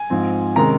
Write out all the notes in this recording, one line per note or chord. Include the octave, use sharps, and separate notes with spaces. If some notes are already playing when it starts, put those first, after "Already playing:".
Already playing: G#5
G#2 F3 C4
C3 D#3 G#3 C#4 A#5